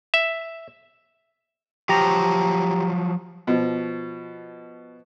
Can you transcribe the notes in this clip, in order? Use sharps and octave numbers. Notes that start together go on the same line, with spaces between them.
E5
F3 F#3 G4 A#5
B2 F3